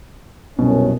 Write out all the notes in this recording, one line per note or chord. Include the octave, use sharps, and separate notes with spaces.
C2 F#2 B2 C#4